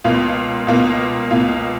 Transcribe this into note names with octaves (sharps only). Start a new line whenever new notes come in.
C#2 B2 A#3 F4
C#2 B2 A#3 F4
C#2 B2 A#3 F4